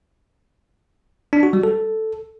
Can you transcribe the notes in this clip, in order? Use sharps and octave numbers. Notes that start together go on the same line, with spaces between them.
D4
F#4
G3
A4